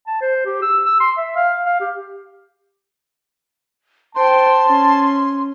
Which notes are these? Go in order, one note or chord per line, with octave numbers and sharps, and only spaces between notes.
A5
C5
G4
E6
E6
C6
E5
F5
F5
G4
C5 G5 A5 C6
C#4